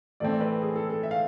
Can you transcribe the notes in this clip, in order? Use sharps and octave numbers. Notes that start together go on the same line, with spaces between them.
A2 E3 A3 C4 D5
D5
B4
G#4
A4
A4
E5
F5